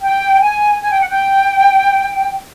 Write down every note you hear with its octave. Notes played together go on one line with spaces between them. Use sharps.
G5
G#5
G#5
G5
F#5
G5